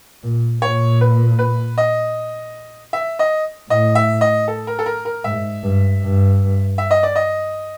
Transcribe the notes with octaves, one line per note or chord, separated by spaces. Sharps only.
A#2
A#2 C#5
B4
B4
D#5
E5
D#5
A2 D#5
E5
D#5
A4
A#4
A4
A#4
A#4
G#2 E5
G2
G2
E5
D#5
D5
D#5